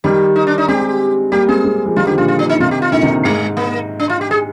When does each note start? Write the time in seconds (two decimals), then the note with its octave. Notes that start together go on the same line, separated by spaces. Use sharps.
0.04 D#3 G3 G4
0.36 D#4
0.47 D4
0.58 D#4
0.68 G#3 C4 G4
1.32 G3 A#3 G4
1.48 G#3 C4 G#4
1.64 G#3 C4
1.85 F3 G#3
1.96 D#3 G3 F4
2.07 D3 F3 G4
2.18 A#2 D3 F4
2.28 F4
2.39 D4
2.49 D#4
2.60 C3 D#3 F4
2.71 G4
2.82 F4
2.92 A#2 D3 D#4
3.03 C3 D#3
3.25 G#2 G#3
3.57 A#3
4.00 D4
4.09 F4
4.21 G4
4.31 G#4